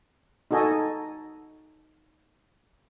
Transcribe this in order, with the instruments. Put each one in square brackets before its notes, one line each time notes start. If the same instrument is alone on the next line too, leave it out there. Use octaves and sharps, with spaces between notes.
[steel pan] D#4 F#4 A4 D#5 G#5